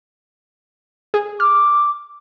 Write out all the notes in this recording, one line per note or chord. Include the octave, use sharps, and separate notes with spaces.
G#4
D6 F6